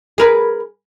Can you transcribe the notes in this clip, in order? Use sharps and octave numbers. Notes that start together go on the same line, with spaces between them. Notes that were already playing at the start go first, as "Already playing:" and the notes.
G#4 A#4 B4